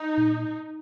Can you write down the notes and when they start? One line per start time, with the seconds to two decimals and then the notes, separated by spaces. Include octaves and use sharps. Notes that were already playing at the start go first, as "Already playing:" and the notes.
Already playing: D#4
0.17 A#2